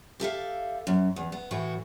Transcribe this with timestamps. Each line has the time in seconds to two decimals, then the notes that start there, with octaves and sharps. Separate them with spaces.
0.20 G4 A4 E5 F5
0.87 F#2
1.16 E2
1.32 B3
1.51 A2 E3 A3 F#4